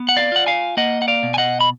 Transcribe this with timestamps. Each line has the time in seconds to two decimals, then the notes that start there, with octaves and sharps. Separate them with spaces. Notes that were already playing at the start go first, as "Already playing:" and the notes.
Already playing: B3
0.09 F#5
0.17 D5 F5
0.32 F4 F#5
0.46 F5 G#5
0.77 A#3 D#5 F#5
1.02 F#5
1.08 D5 F5
1.23 B2
1.34 G#5
1.38 D#5 F#5
1.60 B5